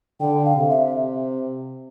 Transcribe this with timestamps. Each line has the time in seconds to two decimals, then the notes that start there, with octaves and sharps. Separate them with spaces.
0.20 D3 G5
0.45 F5
0.56 C3
0.69 E5